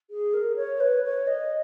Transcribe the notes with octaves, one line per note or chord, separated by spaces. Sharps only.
G#4
A#4
C#5
B4
C#5
D#5